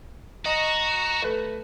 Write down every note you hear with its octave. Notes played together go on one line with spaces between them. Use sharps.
F#4 D#5 A#5
A3 B4